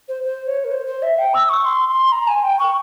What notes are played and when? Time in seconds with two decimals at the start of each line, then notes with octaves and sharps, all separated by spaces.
0.08 C5
0.24 C5
0.47 C#5
0.64 A#4
0.71 C5
0.86 C5
1.02 E5
1.18 G5
1.34 E6
1.49 C#6
1.65 C6
1.88 C6
2.12 A#5
2.27 G#5
2.43 G5
2.59 C#6